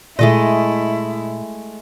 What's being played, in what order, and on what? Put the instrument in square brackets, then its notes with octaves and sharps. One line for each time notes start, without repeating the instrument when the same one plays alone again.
[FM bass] A#2 [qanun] G#3 A3 D#5 [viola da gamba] E4